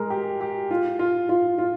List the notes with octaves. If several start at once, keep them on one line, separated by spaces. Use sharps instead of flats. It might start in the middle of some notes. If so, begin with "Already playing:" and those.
Already playing: G#3 A#4
G4
G4
F4
F4
F4
F4